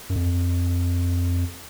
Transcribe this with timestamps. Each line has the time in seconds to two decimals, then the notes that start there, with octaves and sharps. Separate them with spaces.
0.10 F#2
0.16 F2